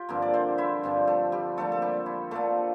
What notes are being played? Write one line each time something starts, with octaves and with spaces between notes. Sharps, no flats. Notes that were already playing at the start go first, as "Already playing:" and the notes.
Already playing: F4 G4
G2 D3 F3 A#3 C4 A#4
D5
C4 C5
E4 E5
G2 D3 F3 C4
A3 A4
G3 G4
D3 F3 A3 A#3 A4
A4
G3 G4
E4
D3 F3 A3 A#3 A4